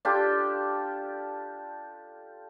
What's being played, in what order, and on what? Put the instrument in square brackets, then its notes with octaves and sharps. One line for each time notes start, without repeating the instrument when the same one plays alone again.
[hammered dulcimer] D4 F4 G4 A4